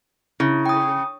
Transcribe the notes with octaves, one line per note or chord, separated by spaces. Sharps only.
C#3 E4
G5 D#6